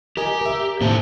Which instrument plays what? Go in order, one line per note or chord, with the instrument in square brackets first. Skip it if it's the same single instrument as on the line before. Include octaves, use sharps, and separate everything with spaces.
[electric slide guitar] G4 [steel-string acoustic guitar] A#4 D#5 G#5
[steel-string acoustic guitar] A#4 D5 E5
[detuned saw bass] A2 [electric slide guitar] D#3 A#3 C5 [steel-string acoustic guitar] C4 A5